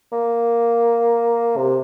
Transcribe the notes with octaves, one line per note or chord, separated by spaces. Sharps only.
A#3
C3